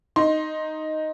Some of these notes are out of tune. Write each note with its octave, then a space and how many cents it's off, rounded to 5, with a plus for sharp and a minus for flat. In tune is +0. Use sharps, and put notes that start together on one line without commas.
D#4 +0 C6 +15